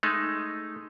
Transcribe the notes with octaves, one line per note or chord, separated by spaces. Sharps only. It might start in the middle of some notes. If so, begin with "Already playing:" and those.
G#3 A3 D#4